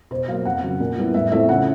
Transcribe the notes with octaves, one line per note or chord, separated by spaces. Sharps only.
B2 C5
F#3 A#3 F5
F2 F#5
C#3 F#3
A#2
G3 B3 E4
A2 E5
F3 A3 C4 E4 E5
C#3 F#5